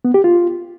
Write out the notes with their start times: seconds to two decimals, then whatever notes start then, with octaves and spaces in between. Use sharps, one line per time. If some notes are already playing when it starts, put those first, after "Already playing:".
0.05 B3
0.14 G4
0.24 F4